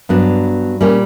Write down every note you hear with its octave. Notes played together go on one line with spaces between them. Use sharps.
G2 F#3 B3 D4
A#2 G3 A#3 C#4